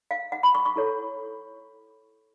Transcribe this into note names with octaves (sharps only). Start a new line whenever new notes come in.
F5
F#5
B5
C#6
C#6
E4 A4 C#5